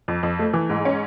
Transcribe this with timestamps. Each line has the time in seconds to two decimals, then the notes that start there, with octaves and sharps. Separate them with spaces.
0.08 F2
0.23 F2
0.39 A3
0.53 E3
0.69 G#2
0.85 C#4